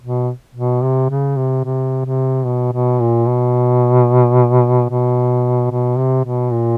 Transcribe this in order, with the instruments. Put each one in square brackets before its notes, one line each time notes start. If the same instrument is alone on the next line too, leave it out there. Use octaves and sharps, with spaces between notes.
[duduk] B2
B2
C3
C#3
C3
C3
C3
B2
B2
A#2
B2
B2
B2
C3
B2
A#2